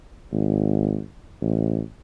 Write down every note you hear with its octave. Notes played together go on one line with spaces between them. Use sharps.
G#1
A1